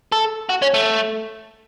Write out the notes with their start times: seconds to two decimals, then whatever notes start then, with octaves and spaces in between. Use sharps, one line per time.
0.12 A4
0.49 F#4
0.62 C#4
0.74 A3